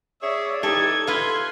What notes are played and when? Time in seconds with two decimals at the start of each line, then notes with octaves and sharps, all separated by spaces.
0.22 G#4 C#5 D5 E5
0.63 E3 D#4 G4 A4 D#5 G#6
1.07 F4 A4 B4 C6